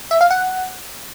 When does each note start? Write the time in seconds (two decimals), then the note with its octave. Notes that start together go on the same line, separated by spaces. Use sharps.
0.11 E5
0.21 F5
0.31 F#5